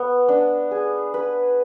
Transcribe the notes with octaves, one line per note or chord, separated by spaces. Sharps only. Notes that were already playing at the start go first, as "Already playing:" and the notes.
Already playing: B3
D4
G#4
B4